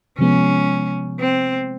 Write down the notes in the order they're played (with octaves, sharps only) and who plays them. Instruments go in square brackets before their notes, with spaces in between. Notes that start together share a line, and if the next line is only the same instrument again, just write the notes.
[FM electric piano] C3 F3 G#3 B3 [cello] C#4
[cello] C4